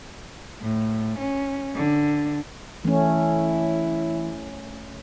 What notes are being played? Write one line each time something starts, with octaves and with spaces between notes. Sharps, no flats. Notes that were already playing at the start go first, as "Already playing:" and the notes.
A2
C#4
D3
E3 A3 C#4 E4